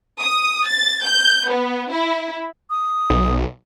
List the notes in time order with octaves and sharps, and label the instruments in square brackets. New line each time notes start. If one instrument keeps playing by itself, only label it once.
[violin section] D#6
A6
G6
B3
E4
[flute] D#6
[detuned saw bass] B1